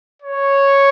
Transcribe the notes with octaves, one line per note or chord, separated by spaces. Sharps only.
C#5